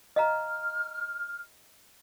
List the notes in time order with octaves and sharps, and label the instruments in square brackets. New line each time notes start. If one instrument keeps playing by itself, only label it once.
[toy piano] D#5 F5 A#5 [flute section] F6